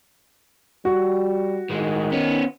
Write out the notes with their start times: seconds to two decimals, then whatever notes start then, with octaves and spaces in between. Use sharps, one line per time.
0.85 G3 F#4
1.70 A2 D#3 G#3
2.12 B3 C#4